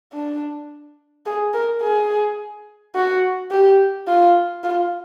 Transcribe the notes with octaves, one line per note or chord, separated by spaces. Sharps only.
D4
G#4
A#4
G#4
F#4
G4
F4
F4